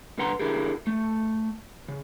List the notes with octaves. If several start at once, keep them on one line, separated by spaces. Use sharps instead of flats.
C2 D3 B4 F#5 A#5 C6
D3 E4 G4 G#4 A#4
A3
C#3